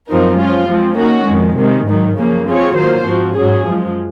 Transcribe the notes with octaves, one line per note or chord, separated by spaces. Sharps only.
F#2 F3 C4 D#4 A#4
F3 G#3 C#4 F4
F3 G#3 C4
D#3 A#3 C#4 F#4
F2 D#3 G#3
C3 D#3 G#3
G#2 D#3 F#3
F#2 C#3 F3 A#3
F3 C4 F4 G#4 C#5
D#3 F#3 A#3 F4 C5
G#2 F3 C4 F#4
G#2 F#3 C#4 G#4
F#2 F3 G#3